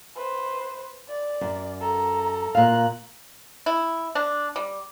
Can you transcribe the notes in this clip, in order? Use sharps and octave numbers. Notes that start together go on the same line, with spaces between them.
B4 C5
D5
F#2
A4 A#5
A#2 F5 A#5 F#6
E4
D4
G3